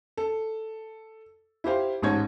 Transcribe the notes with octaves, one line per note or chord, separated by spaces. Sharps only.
A4
E4 G4 C5 F5
A1 G#2 D#4 C#5 A5 G#6